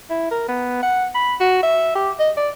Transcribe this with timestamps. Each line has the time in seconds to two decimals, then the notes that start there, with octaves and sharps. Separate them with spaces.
0.10 E4
0.31 A#4
0.49 B3
0.83 F#5
1.15 B5
1.40 F#4
1.63 E5
1.95 G4
2.20 D#5
2.37 D5